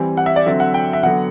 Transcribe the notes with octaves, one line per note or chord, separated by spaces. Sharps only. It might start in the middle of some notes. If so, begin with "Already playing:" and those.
Already playing: E3 G3 C4
F#5
E5
D5
D3 F#3 C4 E5
F#5
G5
E5
D3 F#3 B3 F#5